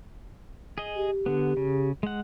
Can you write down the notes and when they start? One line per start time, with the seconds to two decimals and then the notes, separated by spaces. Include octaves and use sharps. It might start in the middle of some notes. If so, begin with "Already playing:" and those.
0.78 G#4 D#5
0.96 G4
1.26 D3 B3
1.57 C#3
2.03 G#3 F#5